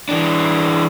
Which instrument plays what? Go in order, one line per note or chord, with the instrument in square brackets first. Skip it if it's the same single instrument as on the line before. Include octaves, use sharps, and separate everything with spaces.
[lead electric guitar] E3 D4